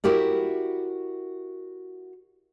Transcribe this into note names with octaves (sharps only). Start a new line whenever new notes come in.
E4 F#4 G4 A#4 D5